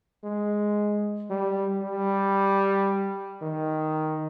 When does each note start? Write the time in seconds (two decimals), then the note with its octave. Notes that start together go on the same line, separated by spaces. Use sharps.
0.24 G#3
1.30 G3
1.82 G3
3.42 D#3